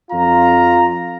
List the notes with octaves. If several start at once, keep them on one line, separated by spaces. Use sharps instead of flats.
F2 F4 A#5